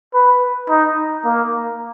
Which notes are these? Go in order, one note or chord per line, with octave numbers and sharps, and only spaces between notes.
B4
D#4
A#3